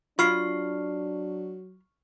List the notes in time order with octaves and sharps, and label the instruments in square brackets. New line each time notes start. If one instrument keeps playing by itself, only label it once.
[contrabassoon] F#3 [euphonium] D4 [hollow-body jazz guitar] F4 B5 [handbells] C#6 F6 C7